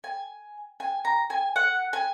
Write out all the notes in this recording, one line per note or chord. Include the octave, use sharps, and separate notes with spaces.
G#5
G#5
A#5
G#5
F#5
G#5